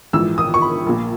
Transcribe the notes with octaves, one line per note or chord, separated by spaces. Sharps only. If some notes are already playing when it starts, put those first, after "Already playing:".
A#1 G#2 E3 E6
D#6
C#6
B5
A#1 A#2